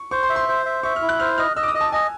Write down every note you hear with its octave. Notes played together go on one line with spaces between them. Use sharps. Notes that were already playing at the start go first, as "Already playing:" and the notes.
Already playing: C#6
C5 C#6
C6
E5
C6
C5
E5
E5 C#6
F6
E4
F#6
C5 F6
D#5 F6
D#5 E6
D6
D#6
D#5
A5
D#5 G#5